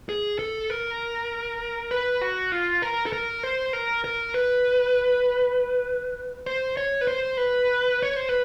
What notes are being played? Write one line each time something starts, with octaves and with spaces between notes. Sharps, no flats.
G#4
A4
A#4
B4
F#4
F4
A#4
A4
A#4
C5
A#4
A#4
B4
C5
C#5
B4
C5
B4
C#5
C5
B4